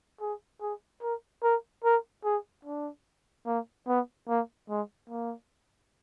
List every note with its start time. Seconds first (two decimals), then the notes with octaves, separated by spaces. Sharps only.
0.21 G#4
0.61 G#4
1.02 A#4
1.43 A#4
1.84 A#4
2.25 G#4
2.65 D4
3.47 A#3
3.88 B3
4.28 A#3
4.69 G#3
5.10 A#3